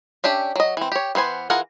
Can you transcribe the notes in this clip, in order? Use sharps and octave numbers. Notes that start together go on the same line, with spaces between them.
C#4 D4 G4 E5
F#3 D#5
E3 C4
G4 C#5
E3 B3 C5 G#5
E3 F4 G#4 A#4 F#5